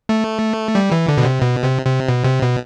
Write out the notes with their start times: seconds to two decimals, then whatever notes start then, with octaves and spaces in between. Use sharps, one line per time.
0.09 A3
0.75 G3
0.92 E3
1.08 D3
1.17 B2
1.25 C3
1.42 B2
1.64 C3
1.85 C3
2.08 B2
2.25 C3
2.42 B2